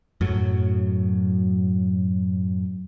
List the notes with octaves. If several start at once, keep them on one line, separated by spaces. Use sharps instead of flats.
F#2 A2 F#3